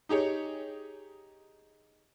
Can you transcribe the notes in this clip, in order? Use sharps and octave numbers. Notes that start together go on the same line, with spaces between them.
D#4 G4 G#4 C#5